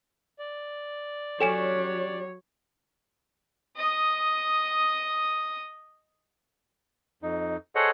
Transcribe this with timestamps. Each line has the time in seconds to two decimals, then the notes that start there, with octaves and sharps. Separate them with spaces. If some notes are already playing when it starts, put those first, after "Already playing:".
0.39 D5
1.41 F#3 C#4 D4 G4 A4 C#5 G#5 E7
3.76 D#5 D#6
7.23 F2 D#4
7.75 G#4 A4 C5 C#5 D#5 F#5